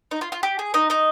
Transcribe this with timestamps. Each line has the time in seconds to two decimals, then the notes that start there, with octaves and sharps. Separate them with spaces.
0.11 D#4
0.21 F4
0.32 F4
0.43 G4
0.59 G#4
0.74 D#4 D#5
0.90 D#4 D#5